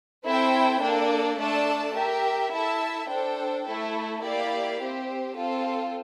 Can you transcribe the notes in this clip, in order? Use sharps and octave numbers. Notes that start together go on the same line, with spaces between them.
C4 E4 A4 C5 G5
A#3 D4 A4 D5
A3 D4 A4 D5 A5
G4 A#4 E5
E4 A4 E5 A5
D4 A4 C5 G5
A3 E4 A4
A#3 E4 G4 D5 F5
C4 G4 C5
C4 F4 A4